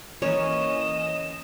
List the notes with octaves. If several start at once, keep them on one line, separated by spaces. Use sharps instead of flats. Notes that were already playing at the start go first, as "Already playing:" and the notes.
E3 A#3 C#4 C#5 D#5 E7